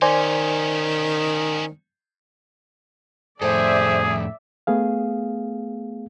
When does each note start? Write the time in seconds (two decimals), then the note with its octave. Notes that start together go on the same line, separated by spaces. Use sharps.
0.02 D#3 C#4 D#4 C5 D5 G#5
3.42 F2 A2 G#4 A4 C5 D5 E5
4.67 A3 B3 G#4 F5